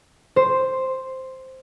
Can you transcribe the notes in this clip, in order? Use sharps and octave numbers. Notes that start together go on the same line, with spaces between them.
C5